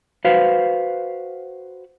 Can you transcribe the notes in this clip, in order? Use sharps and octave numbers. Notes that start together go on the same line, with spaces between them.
F#4 B4 C5 F5